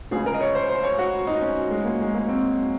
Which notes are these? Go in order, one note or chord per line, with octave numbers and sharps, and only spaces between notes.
C#2 C#3 G#4
A#4
D#5
C#5
C5
C5
C#5
F#4
D#4
C#4
G#3
A#3
G#3
A#3
C4